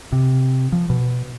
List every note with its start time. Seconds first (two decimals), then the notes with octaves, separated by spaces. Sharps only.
0.12 C3
0.72 F3
0.90 B2